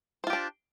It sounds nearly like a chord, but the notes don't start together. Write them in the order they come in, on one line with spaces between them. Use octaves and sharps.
C5 F4 G4 D4